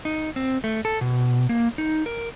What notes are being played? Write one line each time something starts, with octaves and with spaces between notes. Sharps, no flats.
D#4
C4
A3
A4
B2
A#3
D#4
A#4